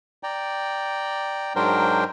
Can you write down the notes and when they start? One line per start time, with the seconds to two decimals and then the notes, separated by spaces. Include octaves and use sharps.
0.23 D5 G5 A#5
1.56 G#2 F#3 D4 A#4 C5 G5